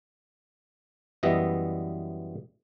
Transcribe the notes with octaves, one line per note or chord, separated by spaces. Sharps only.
F#2 E3 G3 B3 D#5 E5